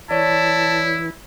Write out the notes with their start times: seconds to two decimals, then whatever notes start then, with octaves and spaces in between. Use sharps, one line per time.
0.11 E3 E4 C#5 D5 A5